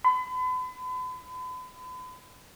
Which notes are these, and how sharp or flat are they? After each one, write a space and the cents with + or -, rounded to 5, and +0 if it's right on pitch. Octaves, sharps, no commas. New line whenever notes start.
B5 +40